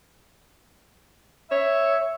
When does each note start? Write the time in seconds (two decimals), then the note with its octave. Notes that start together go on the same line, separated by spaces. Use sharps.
1.51 C#5 E5